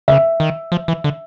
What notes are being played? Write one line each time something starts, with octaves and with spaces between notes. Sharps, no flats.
C#3 E5
D#3
F3
E3
D3